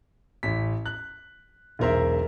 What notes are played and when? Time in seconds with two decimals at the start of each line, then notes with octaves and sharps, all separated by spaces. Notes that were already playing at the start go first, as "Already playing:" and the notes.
0.43 A1 B6
0.86 F#6
1.79 E1 B1 A#4 C5 E5